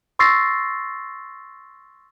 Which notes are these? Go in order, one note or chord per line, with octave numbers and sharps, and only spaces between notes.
C6 C#6 E6 A6 A#6 C7